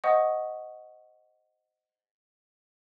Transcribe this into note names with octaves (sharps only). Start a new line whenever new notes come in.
C5 D#5 F#5 C#6 D#6